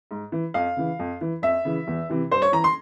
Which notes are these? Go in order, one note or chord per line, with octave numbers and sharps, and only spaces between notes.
G#2
E3
F2 F5
C#3 E3
F2
E3
F2 E5
C#3 E3
E2
C3 E3
G2 C5
C#5
E3 A#5
C6